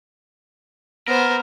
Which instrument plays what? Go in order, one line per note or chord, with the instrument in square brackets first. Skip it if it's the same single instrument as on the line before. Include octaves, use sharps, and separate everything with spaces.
[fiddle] B3 C5 [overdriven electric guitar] A#4